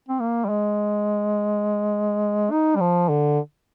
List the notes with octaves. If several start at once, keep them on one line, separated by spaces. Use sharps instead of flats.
C4
A#3
G3
G#3
D#4
G3
F3
D3